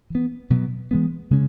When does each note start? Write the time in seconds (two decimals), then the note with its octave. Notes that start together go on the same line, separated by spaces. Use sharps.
0.10 E3 B3
0.50 B2 F#3 B3
0.91 E3 G#3 B3
1.31 C#3 G#3 C#4